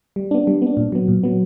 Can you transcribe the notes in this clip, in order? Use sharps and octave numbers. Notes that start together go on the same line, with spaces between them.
G3
B3 D4
G3
B3 D4
A#2
F#3 B3
A#2
F#3 B3